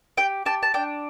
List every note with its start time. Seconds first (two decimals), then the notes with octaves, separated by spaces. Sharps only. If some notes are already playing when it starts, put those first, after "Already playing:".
0.17 G4 G5
0.46 G4 A5
0.63 A5
0.74 D4 G5